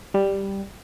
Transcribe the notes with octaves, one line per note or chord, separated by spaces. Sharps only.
G3